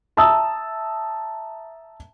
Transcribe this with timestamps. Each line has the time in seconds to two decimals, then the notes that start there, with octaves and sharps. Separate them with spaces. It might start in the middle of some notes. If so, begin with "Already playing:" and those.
0.17 E5 A5 A#5 D#6 E6